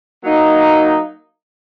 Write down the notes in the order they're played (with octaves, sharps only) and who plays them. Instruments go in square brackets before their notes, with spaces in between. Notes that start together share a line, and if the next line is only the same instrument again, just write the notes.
[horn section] F#3 A#3 D#4